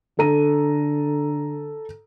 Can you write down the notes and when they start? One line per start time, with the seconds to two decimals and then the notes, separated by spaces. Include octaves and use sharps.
0.19 D3 A4 A#5 D#7